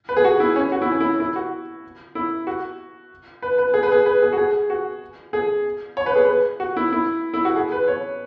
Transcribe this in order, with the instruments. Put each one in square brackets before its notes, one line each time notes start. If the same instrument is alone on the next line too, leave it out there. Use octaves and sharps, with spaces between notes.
[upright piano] B4
G#4
F#4
E4
C#4
F#4
E4
C#4
E4
E4
F#4
E4
F#4
B4
B4
G#4
B4
G#4
B4
G#4
F#4
G#4
F#4
G#4
C#5
B4
G#4
B4
F#4
E4
E4
E4
F#4
G#4
B4
C#5